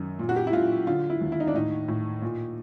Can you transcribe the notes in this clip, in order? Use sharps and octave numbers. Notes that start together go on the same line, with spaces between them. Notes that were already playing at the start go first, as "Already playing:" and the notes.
Already playing: F#2 D#3
A#2
F#4
G4
E4
A#2 F4
D3 F4
E4
D#2
E4
D#4
D4
A2 D#4
A2
A#2